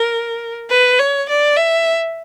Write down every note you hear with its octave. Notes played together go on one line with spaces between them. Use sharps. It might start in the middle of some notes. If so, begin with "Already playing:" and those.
Already playing: A#4
B4
C#5
D5
E5